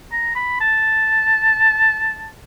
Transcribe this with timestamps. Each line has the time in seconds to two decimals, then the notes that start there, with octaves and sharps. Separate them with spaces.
0.12 A#5
0.36 B5
0.61 A5